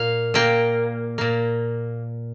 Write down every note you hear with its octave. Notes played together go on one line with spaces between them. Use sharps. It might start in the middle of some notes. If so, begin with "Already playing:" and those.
Already playing: A#2 A#3 F5
A#2 A#3 G5
A#2 A#3